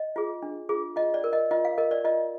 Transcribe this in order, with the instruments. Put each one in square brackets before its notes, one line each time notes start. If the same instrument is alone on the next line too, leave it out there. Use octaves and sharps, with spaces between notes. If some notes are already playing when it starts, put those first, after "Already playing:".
Already playing: [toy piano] D#5
F4 G#4
D4
F4 G#4
F4 D#5
D5
A#4
D#5
F4 D#5
F5
A#4 D#5
D5
F4 D#5